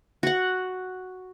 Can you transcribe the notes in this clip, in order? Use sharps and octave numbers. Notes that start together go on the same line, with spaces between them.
F#4 F#5